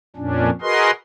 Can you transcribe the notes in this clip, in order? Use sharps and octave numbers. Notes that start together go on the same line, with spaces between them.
F2 A#2 C#4 D4
F#4 G#4 A#4 B4 D#5 C6